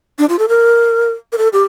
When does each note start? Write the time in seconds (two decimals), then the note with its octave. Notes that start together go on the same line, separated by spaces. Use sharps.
0.19 D4
0.29 F4
0.39 A4
0.49 A#4
1.32 A#4
1.38 A4
1.53 G4